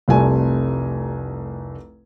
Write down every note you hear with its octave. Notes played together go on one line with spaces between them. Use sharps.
F1 C2 G3 A3 G#5